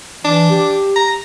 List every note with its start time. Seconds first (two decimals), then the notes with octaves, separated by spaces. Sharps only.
0.25 E3 D4
0.50 G4
0.96 A#5